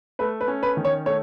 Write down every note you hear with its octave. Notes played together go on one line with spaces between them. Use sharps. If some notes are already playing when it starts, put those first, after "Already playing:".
A3 B4
B4
C#4
B4
D#3
C#5
A3 C#5